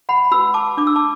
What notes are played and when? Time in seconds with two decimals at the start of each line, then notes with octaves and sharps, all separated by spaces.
0.09 F#5 B5
0.31 F#4 B4 B5 E6
0.54 A5 D6
0.77 D4 D6
0.87 E6
0.96 A5 D6